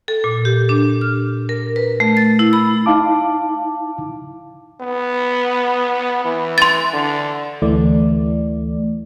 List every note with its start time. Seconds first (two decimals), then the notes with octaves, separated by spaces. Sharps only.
0.08 A4
0.24 A#2
0.45 G4
0.69 D4
1.01 F6
1.49 A#4
1.76 B4
2.00 A3
2.17 A6
2.39 E4
2.53 B5
2.86 D#4 E4 F5 A5 D6
4.81 B3
6.25 E3
6.58 C6 A6
6.93 D3
7.62 D2 E3 A3 D5